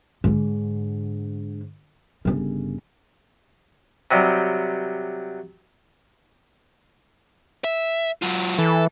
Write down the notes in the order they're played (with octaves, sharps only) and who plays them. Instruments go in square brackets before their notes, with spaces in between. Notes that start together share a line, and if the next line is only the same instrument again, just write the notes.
[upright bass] G#2 D3
G1 C#3
[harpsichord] C3 F#3 G3
[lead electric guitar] E5
F#3 F4
[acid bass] E3 [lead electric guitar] A4